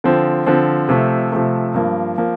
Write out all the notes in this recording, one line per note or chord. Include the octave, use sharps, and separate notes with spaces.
D3 F3 C4
D3 F3 C4
C3 F3 A3
C3 F3 A3
G2 F3 A#3
F3 A#3